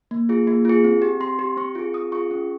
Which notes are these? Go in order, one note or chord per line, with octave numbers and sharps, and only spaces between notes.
A#3
F4 G#4
A#3
F4 G#4
C4
G4
C4 C6
G4
C4 C#6
F4 G#4
C4 D#6
F4 G#4 C#6
C#4